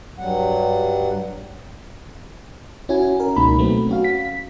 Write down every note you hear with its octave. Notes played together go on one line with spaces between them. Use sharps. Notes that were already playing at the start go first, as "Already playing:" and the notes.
G2 F#3 G3 F#5
C#4 E4 F#4 G#5
A#4
C#2 B2 G#3 A#3 D#4 B5
F#3 A3 B3 C4
C#4 F#4 F5
B6